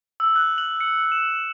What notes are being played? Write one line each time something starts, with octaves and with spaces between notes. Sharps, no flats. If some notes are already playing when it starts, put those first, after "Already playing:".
E6
F#6
F#7
C#7
E7